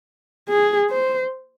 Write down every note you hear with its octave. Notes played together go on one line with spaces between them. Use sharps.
G#4
C5